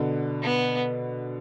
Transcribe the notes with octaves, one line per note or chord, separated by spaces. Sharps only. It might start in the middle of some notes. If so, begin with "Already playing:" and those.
Already playing: B2 D3
B3